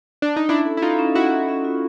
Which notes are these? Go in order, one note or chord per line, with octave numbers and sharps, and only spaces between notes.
D4
D#4
C#4 D4 E4
A4
E4
D#4 F4 A4
C#4
C#4 E4 F#4
C#4
C#4
F4